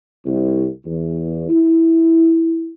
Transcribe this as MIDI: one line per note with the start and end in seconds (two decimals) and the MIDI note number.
0.25 0.67 36
0.85 1.45 40
1.50 2.71 64